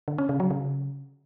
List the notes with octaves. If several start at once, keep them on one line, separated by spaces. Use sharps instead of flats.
D3
C#4
C#3
F#3
C#3